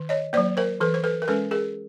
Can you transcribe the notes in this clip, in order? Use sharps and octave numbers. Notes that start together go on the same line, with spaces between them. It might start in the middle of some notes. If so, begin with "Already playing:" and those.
Already playing: D#3
C#5 D#5
F#3 A#3 C5 D5
A#4 C5
E3 A4 B4
C5
A4 B4
A#4
G#3 C#4 A4 B4
G#4 A#4